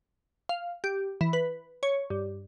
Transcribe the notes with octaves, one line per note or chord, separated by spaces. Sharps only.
F5
G4
E3
B4
C#5
G2